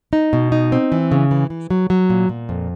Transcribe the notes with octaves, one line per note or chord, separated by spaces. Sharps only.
D#4
B2
D#4
C4
E3
C#3
E3
E3
F#3
F#3
A#2
A#2
F2